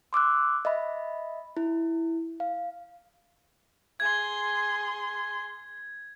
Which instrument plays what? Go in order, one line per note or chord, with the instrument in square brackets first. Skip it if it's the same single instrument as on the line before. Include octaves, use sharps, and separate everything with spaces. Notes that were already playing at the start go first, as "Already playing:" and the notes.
[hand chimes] C6 D6 E6 F#6
D#5 E5 B5
E4
F5
[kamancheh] G#4 C6 [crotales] G#6